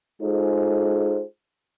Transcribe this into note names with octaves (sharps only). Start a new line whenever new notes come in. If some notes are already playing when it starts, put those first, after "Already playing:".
G#3 D#4 F4 G#4 A4 C5